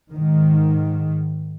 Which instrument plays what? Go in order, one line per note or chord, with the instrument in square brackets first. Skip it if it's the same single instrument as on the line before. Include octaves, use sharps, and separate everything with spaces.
[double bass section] G#2 D#3